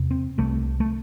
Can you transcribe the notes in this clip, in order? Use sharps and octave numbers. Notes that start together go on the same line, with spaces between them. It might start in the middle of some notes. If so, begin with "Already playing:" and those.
Already playing: E2 C3
C4
C2 C3 A3
A3